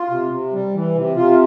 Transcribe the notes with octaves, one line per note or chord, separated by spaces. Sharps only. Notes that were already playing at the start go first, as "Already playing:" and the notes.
Already playing: F4
C3
C3
G3
E3
C3
C3 F4